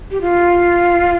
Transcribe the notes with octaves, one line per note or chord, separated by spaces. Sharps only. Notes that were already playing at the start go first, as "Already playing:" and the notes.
G4
F4